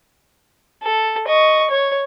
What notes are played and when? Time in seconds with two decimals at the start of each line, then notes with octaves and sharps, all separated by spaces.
0.83 A4
1.27 D#5 C#6
1.70 C#5